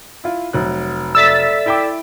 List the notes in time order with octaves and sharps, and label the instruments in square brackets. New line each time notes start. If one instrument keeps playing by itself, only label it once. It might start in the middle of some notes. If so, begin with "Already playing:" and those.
[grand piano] E4 F4
F1 F#3 F#6
[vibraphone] A4 D5 E5 [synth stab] E6 A6 B6
[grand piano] E4 G5 D6